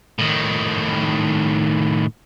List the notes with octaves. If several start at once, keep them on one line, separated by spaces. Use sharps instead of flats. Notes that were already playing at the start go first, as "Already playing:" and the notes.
A2 D#3